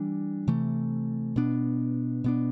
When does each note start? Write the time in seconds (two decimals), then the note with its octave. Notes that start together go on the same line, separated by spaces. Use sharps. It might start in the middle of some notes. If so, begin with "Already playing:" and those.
Already playing: E3 G3 D4
0.48 C3 E3 A3
1.36 B2 B3 D4
2.24 B2 B3 D4